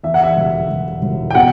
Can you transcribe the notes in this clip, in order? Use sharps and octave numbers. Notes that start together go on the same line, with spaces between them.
E2 E5
F#5
E5
E1
E1
E1
G5
B2 F#5